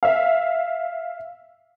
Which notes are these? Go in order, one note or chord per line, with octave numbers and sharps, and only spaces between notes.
E5 F5